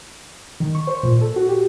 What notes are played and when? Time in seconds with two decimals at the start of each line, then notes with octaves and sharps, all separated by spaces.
0.60 D#3
0.75 C#6
0.87 C5
1.03 A#2
1.21 A4
1.36 F#4
1.49 G4